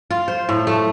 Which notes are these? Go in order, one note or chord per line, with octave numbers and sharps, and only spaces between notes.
F4
C5
A2
A3